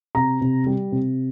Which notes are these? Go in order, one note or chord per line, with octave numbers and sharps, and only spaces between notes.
C3 A#5
C3
G3
C3